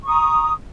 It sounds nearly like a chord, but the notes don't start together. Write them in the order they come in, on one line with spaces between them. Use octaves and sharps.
C#6 D#6 A#5